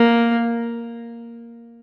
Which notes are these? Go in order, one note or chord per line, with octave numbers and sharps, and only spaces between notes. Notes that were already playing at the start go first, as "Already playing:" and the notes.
Already playing: A#3